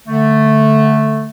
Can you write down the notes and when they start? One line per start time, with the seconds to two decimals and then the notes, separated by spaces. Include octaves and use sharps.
0.08 D3 A3